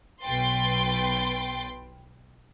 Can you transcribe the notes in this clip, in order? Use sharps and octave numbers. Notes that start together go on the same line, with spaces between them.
B1 B4 G5 C6 A6